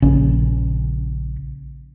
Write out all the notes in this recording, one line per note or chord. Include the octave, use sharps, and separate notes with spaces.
A#1 C#3 C#4